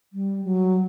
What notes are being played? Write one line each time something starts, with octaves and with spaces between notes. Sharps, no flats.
G3
F#3